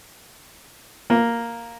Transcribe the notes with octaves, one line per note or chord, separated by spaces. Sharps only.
A#3